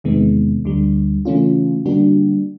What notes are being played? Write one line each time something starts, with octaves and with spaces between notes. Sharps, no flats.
E2 C3 D#3 G#3 B3
D2 D3 G3
C#3 E3 A3 C#4 F4
D3 G3 A#3 D4 F#4